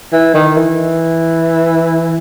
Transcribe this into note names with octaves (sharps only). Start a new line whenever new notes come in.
E3
D#3
E3